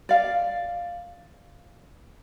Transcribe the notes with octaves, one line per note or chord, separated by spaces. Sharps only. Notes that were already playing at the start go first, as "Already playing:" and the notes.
D5 F5